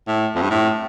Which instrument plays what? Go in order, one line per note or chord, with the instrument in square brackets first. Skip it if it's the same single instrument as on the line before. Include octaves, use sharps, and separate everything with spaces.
[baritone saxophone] A2
F2
G2
A2